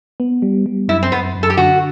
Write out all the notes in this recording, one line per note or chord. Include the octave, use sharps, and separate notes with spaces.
B3
G3
G3
F#2 E4
C4
F#2 B3
F#2
A4
G4
D3 F#4